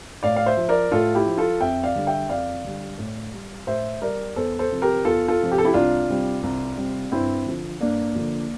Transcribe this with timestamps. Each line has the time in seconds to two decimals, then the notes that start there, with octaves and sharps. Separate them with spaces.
0.23 A2 D5 F5
0.36 F5
0.46 C5 E5
0.57 F3
0.69 A#4 D5
0.92 A2 F4 A4
1.15 E4 G4
1.26 F3
1.38 F4 A4
1.61 F2 E5 G5
1.84 D5 F5
1.96 D3 G3
2.07 E5 G5
2.30 F2 D5 F5
2.64 D3 G3
2.99 A2
3.33 G3
3.67 A2 C5 E5
4.02 G3 A#4 D5
4.36 E2 A4 C5
4.59 A4 C5
4.71 C3 F3
4.82 G4 A#4
5.05 E2 F4 A4
5.28 F4 A4
5.40 C3 F3
5.52 G4
5.58 A4
5.65 E4 G4
5.74 C2 D4 F4
6.09 C3 G3
6.43 C2
6.77 C3 G3
7.12 G2 C4 E4
7.46 D3 F3
7.81 G2 A#3 D4
8.15 D3 F3